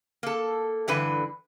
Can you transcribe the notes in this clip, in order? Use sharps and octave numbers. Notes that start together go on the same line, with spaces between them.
A#3 A4
G2 D3 E3 B4